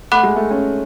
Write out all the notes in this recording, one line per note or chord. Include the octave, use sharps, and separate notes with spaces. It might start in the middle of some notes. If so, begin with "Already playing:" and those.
A3 F#5 B5 D6 F#6
G#3
A3
C#4